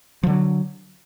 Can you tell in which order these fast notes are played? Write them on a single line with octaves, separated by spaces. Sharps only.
F3 D3 F#3